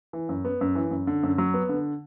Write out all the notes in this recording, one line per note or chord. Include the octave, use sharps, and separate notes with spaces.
E3
F#2
B3
F#2
E3
F#2
D3
F#2
F#3
B3
D3